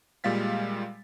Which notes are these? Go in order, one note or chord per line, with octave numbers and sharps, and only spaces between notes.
A#2 G3 G#3 F5 A6 B6